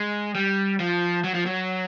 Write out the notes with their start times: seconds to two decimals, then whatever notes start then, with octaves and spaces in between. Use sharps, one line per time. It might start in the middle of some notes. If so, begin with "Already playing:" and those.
Already playing: G#3
0.35 G3
0.80 F3
1.24 F#3
1.34 F3
1.46 F#3